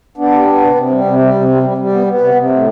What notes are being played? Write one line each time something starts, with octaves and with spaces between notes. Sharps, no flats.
B3 D4
G3
B3
C3
C3
G3
C3
G3
C3
G3
G3
G3
B3
B3
C3
C3
A2